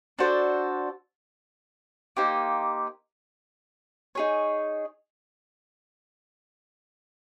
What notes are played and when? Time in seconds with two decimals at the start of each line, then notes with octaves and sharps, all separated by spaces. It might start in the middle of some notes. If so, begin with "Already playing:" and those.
0.19 D4 F#4 A4 C5
2.17 A#3 D#4 G4 C5
4.15 D#4 G#4 C#5